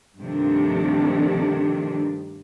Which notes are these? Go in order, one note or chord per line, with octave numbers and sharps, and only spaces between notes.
G2 C3 D#3 F3 A3 D4